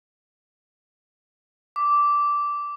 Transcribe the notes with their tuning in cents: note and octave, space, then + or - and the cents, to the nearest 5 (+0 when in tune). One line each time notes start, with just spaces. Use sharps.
D6 -10